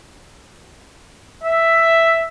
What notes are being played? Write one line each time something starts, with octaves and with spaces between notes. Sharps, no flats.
E5